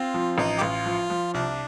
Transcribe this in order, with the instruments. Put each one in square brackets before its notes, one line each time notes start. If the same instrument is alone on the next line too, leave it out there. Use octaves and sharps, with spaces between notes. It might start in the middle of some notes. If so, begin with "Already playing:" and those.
Already playing: [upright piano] C4 [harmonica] F4
[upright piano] F3
[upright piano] A1 [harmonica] D#4
[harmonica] G4
[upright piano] A1 [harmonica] F4
[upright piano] F3
F3
[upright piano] C2 [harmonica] D4